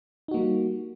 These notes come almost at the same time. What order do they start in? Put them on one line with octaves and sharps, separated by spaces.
D#4 F#4 A#3 G3